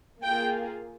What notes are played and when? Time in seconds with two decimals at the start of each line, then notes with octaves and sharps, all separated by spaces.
0.22 A#3 F4 G#4 G5